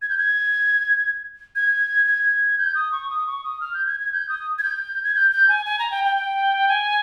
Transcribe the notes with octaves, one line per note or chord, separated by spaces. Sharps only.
G#6
G6
G#6
G#6
G#6
G6
D#6
C#6
D#6
C#6
D#6
F6
G6
G#6
G#6
G6
D#6
G#6
G6
G#6
G6
G6
G#5
G#5
A#5
G5
G5
G5
G#5